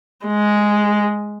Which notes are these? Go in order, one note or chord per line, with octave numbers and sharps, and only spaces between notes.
G#3